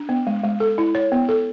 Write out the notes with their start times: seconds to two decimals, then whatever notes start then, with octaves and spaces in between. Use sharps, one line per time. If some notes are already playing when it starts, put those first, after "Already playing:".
Already playing: D4
0.09 B3
0.27 G#3
0.44 G#3
0.60 A4
0.78 E4
0.95 C#5
1.12 B3
1.29 A4